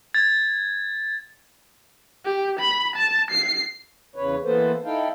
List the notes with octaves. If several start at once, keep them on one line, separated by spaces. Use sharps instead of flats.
G#6 A6
G4
B5
A5
C7
E2 C#3 B4 C#5
E3 A#3 B3 A4 B4 C5
D#4 E4 A4 F5 G5